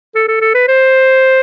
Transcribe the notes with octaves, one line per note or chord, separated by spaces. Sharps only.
A4
A4
A4
B4
C5